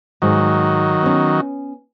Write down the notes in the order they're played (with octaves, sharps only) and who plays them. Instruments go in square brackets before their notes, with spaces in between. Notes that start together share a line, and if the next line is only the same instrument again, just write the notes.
[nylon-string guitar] G#2 [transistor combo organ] D#3 F#3
[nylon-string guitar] B3 C#4